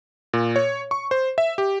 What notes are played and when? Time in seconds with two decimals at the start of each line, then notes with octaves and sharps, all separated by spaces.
0.33 A#2
0.56 C#5
0.91 C#6
1.11 C5
1.38 E5
1.58 G4